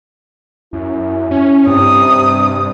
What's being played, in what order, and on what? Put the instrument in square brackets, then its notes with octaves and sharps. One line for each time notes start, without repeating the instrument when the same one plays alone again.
[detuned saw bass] F#2 [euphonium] E4
[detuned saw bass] C#4
[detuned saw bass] G2 [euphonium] C3 [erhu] D#6